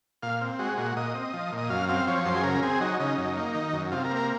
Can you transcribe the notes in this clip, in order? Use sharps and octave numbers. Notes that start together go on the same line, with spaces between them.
A#2 F5
C4
G#3 F#4
A#2 F#4
A#2 D#5
C4
F3
A#2
D#5
F#2 F5
C4 F5
F3 C#5
F#2 C5
G#4
C#3 A#4
C4 G#4
F#3 D#4
C#3 D#4
F#2
A#3
D#3
F#2
C3 F4
A#4
A#3
A#4